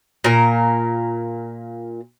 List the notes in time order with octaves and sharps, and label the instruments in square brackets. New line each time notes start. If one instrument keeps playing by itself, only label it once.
[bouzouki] A#2 A#4